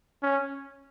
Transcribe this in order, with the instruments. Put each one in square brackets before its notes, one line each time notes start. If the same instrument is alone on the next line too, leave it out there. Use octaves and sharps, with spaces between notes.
[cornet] C#4